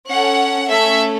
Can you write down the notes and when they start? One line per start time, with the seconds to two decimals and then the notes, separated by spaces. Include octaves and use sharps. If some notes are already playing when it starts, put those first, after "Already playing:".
0.08 C#4 A4 F#5
0.68 A3 C#4 A4 E5